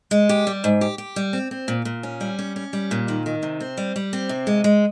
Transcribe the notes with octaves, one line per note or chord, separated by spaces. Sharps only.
G#3
G4
G3
G#2
G4
G4
G3
C4
C4
A#2
A#2
C#4
G3
C#4
C#4
G3
A#2
D#3
D#3
C3
C4
G3
G3
C4
C3
G#3
G#3